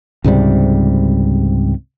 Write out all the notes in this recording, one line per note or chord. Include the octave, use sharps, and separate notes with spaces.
C#2 G#2 C3 G3